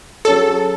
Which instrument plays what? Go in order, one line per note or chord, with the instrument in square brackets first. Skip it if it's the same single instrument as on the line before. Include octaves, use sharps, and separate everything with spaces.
[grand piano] F#3 C#4 G#4 C#5 [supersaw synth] A4